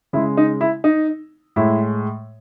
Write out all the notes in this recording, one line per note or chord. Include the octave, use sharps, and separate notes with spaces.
C#3 G#3 E4
D#4
E4
D#4
A2 G#3 E4